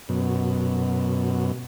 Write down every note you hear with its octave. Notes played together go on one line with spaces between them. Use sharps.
F#2 B2